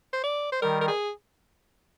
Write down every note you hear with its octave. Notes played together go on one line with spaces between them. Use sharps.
C5
D5
C5
D#3 G3 A#4
A#4
G#4